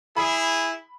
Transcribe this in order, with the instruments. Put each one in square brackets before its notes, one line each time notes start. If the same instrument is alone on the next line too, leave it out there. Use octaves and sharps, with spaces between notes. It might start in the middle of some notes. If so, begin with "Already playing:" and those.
[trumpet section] E4 G#4 [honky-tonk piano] B5